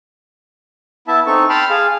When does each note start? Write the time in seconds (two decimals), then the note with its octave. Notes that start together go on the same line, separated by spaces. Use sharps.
1.08 B3 E4 E5 A5
1.26 C4 D#4 A4 C#6
1.49 G5 A5 B5 C6 F6
1.70 G#4 F5